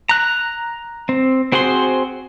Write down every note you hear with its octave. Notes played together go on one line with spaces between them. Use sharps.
A#5 F#6
C4
C4 F#4 G#4 C5 C6